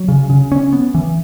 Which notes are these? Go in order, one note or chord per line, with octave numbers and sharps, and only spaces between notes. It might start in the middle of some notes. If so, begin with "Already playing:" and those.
Already playing: F#3
C#3
C#3
C#4
B3
E3